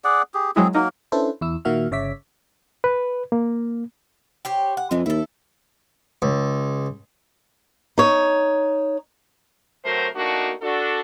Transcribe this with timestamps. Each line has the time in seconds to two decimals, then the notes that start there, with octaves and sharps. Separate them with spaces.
0.04 G#4 D5 F#5
0.34 G4 G#4
0.56 F#3 G#3 C4 E4 G#4
0.75 F#3 A#3 D#4 A#4
1.12 C#4 D4 E4 A4 B4 C5
1.41 E2 E4 E6
1.65 A#2 D#3 A#3 F#4 E5 F6
1.91 G1 C#3 C#5 E5 D6 B6
2.84 B4
3.32 A#3
4.45 G4 C5 C#5
4.77 F#5
4.91 F2 E3 G#3
5.06 D#2 E4 A4
6.22 C#2
7.98 D#4 C#5
9.84 C3 F#3 A3 F#4 A#4 C5
10.15 A3 A#3 D4 D#4 F#4
10.62 D4 F#4 A4